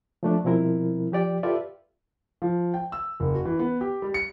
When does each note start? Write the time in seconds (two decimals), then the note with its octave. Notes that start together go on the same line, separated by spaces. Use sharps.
0.23 F3 A3 D4
0.44 B2 F3 G3 C4 E4 A#4
1.12 F3 G4 D5 G5
1.43 F4 G4 A4 B4 D5 E5
2.42 F3
2.74 G5
2.92 E6
3.20 F#1
3.34 F#4
3.45 E3
3.59 B3
3.81 G4
4.02 G3
4.14 C#7